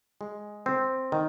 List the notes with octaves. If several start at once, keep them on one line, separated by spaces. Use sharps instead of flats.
G#3
C4
D#3